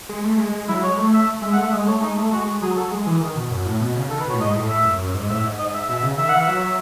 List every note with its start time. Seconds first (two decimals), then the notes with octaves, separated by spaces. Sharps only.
0.09 G#3
0.24 A3
0.38 G#3
0.53 G#3
0.68 F#3 E4
0.82 G#3 C#5
0.97 A3
1.13 E5
1.42 G#3 E5
1.53 F#5
1.57 A3 E5
1.72 G#3 D#5
1.87 A3 C#5
2.01 G#3 D#4
2.17 A3
2.32 G#3 F#4
2.62 F#3 G#4
2.76 A4
2.91 G#3 G#4
3.06 E3
3.21 D#3
3.36 B2
3.51 F#2
3.66 A2
3.81 B2
3.96 C#3
4.10 D#3 A4
4.20 B4
4.25 B2 C#5
4.34 A2
4.40 G#2 D#5
4.55 A2
4.69 A2 E5
4.85 F#2
4.99 F#2
5.14 G#2
5.30 A2 E5
5.43 G#2
5.59 G#2 D#5
5.74 E5
5.89 B2 E5
6.03 C#3
6.18 D#3 E5
6.29 E3 F#5
6.40 E5
6.48 F#3